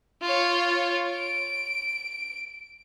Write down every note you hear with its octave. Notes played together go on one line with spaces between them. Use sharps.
F4 C#5
D7